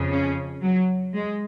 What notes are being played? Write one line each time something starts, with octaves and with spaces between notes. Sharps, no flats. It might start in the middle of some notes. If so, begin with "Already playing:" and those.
Already playing: F2 C#3 F3
C#4
F#3
G#3